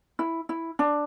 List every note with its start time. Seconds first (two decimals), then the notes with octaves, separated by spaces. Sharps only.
0.19 E4
0.49 E4
0.79 D4